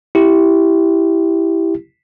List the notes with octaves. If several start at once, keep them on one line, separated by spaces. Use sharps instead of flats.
E4 G4